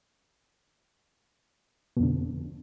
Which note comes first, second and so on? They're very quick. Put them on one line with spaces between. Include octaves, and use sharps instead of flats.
B2 F2 D3